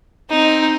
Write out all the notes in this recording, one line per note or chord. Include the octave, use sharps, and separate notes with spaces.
C4 D#4